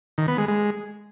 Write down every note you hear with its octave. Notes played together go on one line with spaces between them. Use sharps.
D#3
B3
G#3
G#3